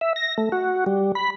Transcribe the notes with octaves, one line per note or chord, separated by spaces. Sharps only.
E5
A#6
A3
F#4
G3
B5